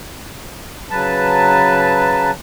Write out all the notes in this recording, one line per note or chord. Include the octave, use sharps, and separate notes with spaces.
C#3 F#3 B4 A5